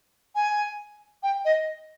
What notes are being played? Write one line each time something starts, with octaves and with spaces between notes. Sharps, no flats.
G#5
G5
D#5